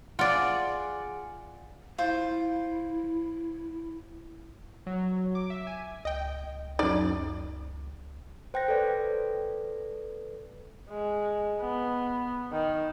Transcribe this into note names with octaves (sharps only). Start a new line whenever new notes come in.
F4 G#4 D5 F#5
E4 F4 C5
F#3
D6
E5
G#5
C#2 D#5 G5
F#2 D#4 D5
C5 G5 F#6 A#6
A4 B4 D5
G#3
B3
D#3